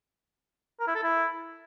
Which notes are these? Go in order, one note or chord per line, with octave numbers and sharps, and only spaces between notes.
A#4
E4
A4
E4